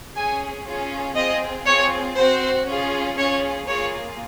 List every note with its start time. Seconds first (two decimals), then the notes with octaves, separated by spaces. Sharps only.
0.14 C#4 G#4 G#5
0.65 C#4 F4 G#4
1.15 C4 F4 G#4 D#5
1.66 C4 F4 G#4 C#5
2.16 C4 F#4 C5
2.67 C#4 F4 G#4
3.17 C#4 F4 G#4 C#5
3.68 A#3 F4 G#4 C#5